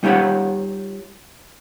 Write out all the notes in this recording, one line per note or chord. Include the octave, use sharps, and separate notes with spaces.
G3 D#4 F4 G4 C#5 F#5